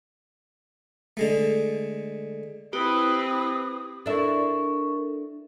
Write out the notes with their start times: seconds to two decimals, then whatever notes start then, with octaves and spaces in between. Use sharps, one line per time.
1.17 D3 G#3 A3
2.73 C4 E4 G4 B4 D#6
4.06 D4 E4 A4 A#4 C#6